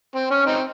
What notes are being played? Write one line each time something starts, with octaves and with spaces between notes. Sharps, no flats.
C4
C#4
C4 D#4